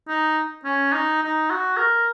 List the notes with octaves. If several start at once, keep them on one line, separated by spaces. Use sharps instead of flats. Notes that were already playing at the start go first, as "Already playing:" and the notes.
D#4
C#4
D#4
D#4
F#4
A#4